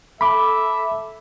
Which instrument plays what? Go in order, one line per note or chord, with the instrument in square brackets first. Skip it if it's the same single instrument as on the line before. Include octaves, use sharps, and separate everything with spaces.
[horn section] A4 E5 [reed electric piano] B5 D6